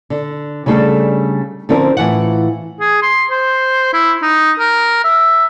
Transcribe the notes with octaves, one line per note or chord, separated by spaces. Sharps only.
D3
C#3 G3 A3 D4 G#4 A4
D3 F3 C4 C#4 A#4
A2 E3 F4 F#5
G#4
C6
C5
E4
D#4
A#4
E5